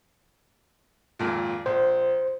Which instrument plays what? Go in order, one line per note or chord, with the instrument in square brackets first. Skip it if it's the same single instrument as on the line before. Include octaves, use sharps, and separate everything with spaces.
[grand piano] G#1 F2 A#2
[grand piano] A#1 [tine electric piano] C5